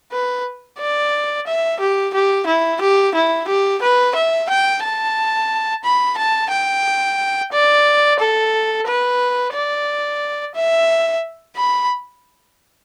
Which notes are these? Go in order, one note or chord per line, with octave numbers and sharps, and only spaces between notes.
B4
D5
E5
G4
G4
E4
G4
E4
G4
B4
E5
G5
A5
B5
A5
G5
D5
A4
B4
D5
E5
B5